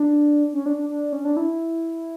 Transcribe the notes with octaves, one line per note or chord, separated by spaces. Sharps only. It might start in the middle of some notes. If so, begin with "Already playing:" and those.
Already playing: D4
C#4
D4
D4
D4
C#4
D4
E4